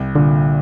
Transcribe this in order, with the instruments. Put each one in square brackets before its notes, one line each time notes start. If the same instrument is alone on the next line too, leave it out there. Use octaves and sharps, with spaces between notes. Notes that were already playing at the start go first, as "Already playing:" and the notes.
Already playing: [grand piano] C2
[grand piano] A#2 [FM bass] D3